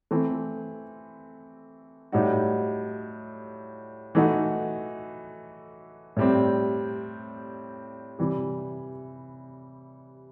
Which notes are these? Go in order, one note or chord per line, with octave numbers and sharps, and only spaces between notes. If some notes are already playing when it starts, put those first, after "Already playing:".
E3 A3 C4
A2 G3 D#4 F#4
E3 A3 D#4 F#4
A2 G3 C4
C3 E3 G3